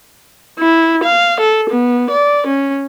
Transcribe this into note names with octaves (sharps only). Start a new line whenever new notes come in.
E4
F5
A4
B3
D5
C#4